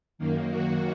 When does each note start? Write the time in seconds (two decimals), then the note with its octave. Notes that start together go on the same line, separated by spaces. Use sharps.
0.18 F#2 D#3 A#3
0.51 F#4